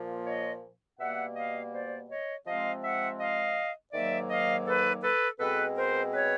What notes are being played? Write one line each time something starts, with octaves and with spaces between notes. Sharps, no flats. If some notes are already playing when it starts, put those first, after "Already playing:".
Already playing: A#2 F3 A#3
C#5 D#5
B2 G3 A#3 E5 F#5
D#5 F5
C5 D5
C#5 D#5
C3 F3 G#3 C4 D#5 F5
E5 F#5
D#5 F5
G#2 D#3 F#3 A#3 D5 E5
D#5 F5
A4 B4
A4 B4
B2 G#3 C4 A4 B4
A#4 C5
B4 C#5